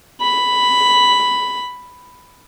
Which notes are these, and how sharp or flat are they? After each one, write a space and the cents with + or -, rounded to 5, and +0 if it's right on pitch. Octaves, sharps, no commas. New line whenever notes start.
B5 +5